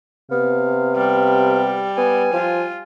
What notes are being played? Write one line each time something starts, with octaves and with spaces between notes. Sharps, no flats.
C3 B3 F5
G3 F5
B3 G#5
F3 F4